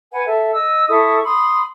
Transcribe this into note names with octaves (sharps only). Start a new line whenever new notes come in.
B4 F#5 G#5
A4 E5
D#5 E6
E4 A4 C#6 D#6
B5 C6 D#6